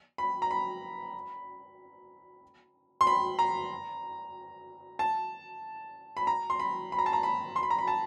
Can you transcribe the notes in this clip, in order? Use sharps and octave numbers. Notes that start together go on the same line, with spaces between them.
B5
A#5
B5
C6
B5
A#5
A5
B5
A#5
C6
B5
B5
A#5
A5
A#5
B5
C6
B5
A#5
B5
A5